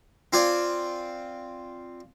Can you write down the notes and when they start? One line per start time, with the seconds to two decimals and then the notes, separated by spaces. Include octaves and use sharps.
0.33 C4 F4 D5 G#5